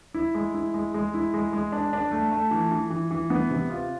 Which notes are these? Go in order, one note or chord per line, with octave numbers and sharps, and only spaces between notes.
E4
G#3
E4
G#3
G#3
E4
G#3
G#3
D4
D4
A3
A3
E3
E3
E3
E3
B3
C3
F4